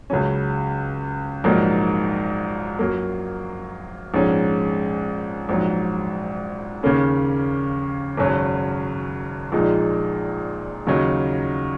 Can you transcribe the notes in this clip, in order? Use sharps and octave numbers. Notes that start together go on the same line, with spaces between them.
C#2 C#3 F#3 C#4
A#1 G#2 F#3 A#3 D#4
F#2 F#3 A#3
A#1 G#2 G#3 C#4
A#1 G#2 F#3
D#2 C#3 A#3 C#4
G#1 F#2 C#3 F#3 C#4
A#1 A#2 G#3 D#4
D#2 C#3 F#3 D#4